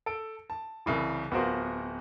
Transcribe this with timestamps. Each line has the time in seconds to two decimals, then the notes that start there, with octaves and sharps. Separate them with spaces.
0.06 A4 D7
0.50 A5
0.86 C2 C#3 E3
1.31 D1 B3 F4 F#4 A#4 C5